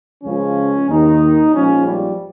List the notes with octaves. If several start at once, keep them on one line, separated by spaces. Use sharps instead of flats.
C#2 C#3 F3 C#4
D#2 D#3 D#4
A#1 G#2 F3 C#4
G3